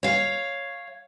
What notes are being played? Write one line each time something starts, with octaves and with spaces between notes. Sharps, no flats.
C#5 F5